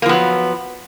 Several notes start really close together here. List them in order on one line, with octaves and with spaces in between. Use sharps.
A#3 F3 B3 F#3